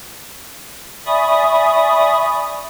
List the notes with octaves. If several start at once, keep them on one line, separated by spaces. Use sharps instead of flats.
D5 E5 G#5 B5 C#6 D#6